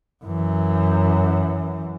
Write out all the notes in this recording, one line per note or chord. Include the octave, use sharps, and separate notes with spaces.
F#2 E3